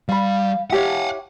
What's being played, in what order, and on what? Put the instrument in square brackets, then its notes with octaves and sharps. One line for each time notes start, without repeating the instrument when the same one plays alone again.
[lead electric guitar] G3 [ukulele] F5 B5
[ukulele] E4 G4 C#5 [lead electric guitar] F5 F#5